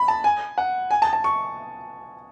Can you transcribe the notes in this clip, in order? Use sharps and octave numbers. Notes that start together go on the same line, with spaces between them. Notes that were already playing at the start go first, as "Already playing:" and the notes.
Already playing: B5
A5
G#5
F#5
G#5
A5
A5
C#6